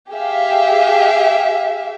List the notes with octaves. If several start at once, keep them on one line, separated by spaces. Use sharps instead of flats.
G4 G#4 E5 F5